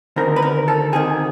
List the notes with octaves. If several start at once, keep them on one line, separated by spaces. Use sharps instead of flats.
D2 C3 D#3 A#4
B4
A#4
A4
D2 C3 D#3 G#4